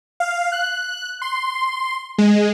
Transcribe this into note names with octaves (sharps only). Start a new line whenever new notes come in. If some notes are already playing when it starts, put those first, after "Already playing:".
F5
F#6
C6
G#3